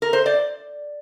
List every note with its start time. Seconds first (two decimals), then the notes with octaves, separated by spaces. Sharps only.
0.02 A#4
0.13 C5
0.26 D5